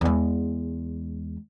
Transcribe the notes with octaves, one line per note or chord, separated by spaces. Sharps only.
E2 G#3